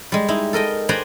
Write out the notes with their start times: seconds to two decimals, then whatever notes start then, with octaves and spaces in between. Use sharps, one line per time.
0.12 G3 G#3
0.28 D#4 E4
0.53 A4 A#4 D#5 G5
0.89 B4 C5 D5 G5 G#5 A#5